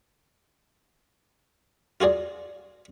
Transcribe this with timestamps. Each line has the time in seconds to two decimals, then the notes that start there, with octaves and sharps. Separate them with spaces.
2.01 F4 F#4 G#4 D5